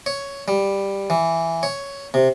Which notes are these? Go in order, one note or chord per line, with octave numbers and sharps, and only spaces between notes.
C#5
G3
E3
C#5
C3